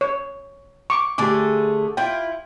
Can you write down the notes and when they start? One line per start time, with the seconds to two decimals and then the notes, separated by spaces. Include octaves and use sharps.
0.01 C#5
0.90 C#6 D6
1.18 D3 A3 G4 G#4 D6
1.97 E4 F4 G5